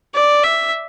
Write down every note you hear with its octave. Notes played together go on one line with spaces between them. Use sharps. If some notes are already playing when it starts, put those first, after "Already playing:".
D5
E5